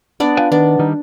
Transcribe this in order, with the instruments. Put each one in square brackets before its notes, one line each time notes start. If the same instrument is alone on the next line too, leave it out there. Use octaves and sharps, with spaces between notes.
[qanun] B3 D4 D5
[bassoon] F4 [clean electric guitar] B4 G5 G#5
[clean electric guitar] D#3 [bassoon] B3 [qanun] D4
[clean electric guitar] D#3 G3 D#4